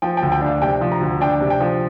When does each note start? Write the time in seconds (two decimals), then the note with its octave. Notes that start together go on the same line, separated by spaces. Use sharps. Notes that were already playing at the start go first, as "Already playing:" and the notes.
0.02 F3 G5
0.17 G5
0.22 D2
0.32 G5
0.41 D4 F5
0.62 C3 G5
0.81 F3
0.92 A#5
1.01 D2
1.21 D4 G5
1.41 C3
1.50 G5
1.60 F3